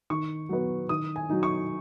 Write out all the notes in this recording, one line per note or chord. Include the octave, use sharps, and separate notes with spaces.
D#3 C#6
F#3 B3
D#3 D#6
G#5
F#3 D#4
C#6